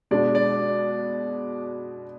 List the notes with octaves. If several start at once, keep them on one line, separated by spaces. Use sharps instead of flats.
B2 G#3 D4 D5
D5